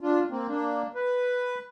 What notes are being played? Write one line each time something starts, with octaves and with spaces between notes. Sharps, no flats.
D4 F4
A#3 C4
A#3 D4
B4